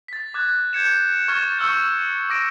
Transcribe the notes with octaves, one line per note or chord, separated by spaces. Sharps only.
A6 B6
D6 F#6 G#6
G6 G#6 C#7 E7
C#6 F6 G#6 A6 E7
C#6 E6 F6 G6 C#7
D6 A#6 D7